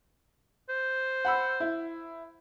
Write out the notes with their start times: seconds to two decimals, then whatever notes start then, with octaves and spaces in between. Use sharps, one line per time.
0.69 C5
1.25 F#5 B5 E6
1.60 E4